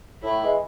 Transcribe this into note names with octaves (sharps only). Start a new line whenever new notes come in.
A2 E4
E3 G#3